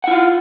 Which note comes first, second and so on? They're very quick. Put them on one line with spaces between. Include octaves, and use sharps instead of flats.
F#5 E4 F4